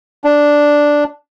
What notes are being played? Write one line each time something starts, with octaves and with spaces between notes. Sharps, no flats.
D4